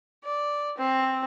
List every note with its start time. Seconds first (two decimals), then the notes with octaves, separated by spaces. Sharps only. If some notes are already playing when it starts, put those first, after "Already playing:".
0.24 D5
0.78 C4